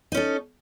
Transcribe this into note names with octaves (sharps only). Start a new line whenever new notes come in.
C#4 D#4 A4